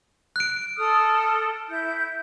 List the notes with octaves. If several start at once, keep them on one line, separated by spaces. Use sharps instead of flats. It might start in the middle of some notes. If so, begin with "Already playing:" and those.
F#6 D7
A4 D#6 F6
E4 G6